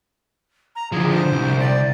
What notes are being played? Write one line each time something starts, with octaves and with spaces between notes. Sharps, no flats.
A#5
D3 F3 G#4
C5
C2
D5